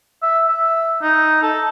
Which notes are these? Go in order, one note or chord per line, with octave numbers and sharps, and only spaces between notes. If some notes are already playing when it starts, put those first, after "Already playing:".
E5
E5
D#4
A4